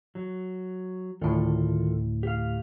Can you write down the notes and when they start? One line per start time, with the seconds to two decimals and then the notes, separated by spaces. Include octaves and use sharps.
0.15 F#3
1.21 D2 A2 D#3 F4 A4
2.23 G4 F5